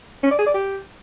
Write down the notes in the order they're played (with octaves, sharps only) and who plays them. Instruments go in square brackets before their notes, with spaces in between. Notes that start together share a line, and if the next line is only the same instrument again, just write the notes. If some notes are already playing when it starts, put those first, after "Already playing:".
[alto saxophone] C#4
D5
G#4
D5
G4